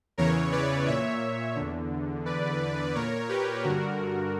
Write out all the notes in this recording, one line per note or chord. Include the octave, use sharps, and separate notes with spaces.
E2 C#3 E3 A#4 C#5
B4 D5
A#2 C#5 E5
E2 D3
E2 D3 B4 D5
A#2 A#4 C#5
G4 B4
G2 D3 F#4 A#4